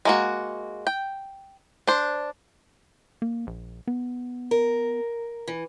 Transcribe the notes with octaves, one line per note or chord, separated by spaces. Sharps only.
G#3 A#3 F#4
G5
D4 C5
A#3
A#1
B3
A#4
E3